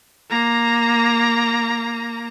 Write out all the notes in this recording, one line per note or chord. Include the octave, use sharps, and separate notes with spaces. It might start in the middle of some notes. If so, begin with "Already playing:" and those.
A#3 A#5